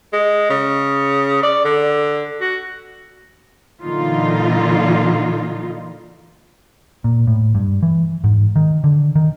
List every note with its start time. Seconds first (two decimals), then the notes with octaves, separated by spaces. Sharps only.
0.13 G#3
0.50 C#3
1.43 D5
1.65 D3
2.41 F#4
3.81 A#2 D3 E3 F#3 D#4 F4
7.04 A#2
7.27 A2
7.55 G2
7.83 E3
8.24 G#2
8.56 D#3
8.84 D3
9.16 D#3